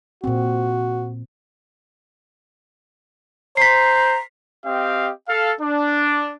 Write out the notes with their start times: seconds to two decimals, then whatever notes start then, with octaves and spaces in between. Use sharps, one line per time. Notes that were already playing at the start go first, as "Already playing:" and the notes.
0.24 A#2 C4 F#4
3.57 C5 A#5 B6 C7
4.65 C4 G4 D#5 F5
5.27 A4 F5
5.60 D4